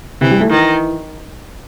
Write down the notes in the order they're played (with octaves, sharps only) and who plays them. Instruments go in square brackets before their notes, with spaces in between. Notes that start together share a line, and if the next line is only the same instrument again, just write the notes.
[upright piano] C3 [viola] E3
[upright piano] G3
A3
[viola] D#3 [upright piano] E3